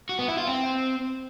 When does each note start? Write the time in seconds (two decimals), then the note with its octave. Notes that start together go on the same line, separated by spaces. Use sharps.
0.09 F#4
0.19 B3
0.28 E4
0.38 F4
0.47 C4